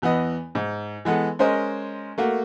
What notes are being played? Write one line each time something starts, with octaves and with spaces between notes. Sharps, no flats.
E2 E3 B3 D#5
G#2
E3 G#3 B3 A4
G#3 C#4 A#4 C5 D#5
A3 A#3 F#4